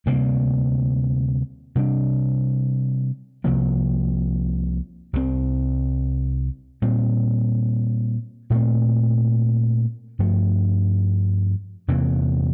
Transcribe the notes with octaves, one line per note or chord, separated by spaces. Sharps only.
D2 C3 G3 A#3
C3 G3 D4
C2 C3 F3 A#3
C2 C3 F3 C4
A#2 G3 C4
A#2 A3 C4
G2 F3 A3
E2 C3 E3 A#3